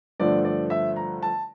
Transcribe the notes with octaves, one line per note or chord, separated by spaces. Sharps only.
G2 D3 F3 A3 D5
D5
E5
A#5
A5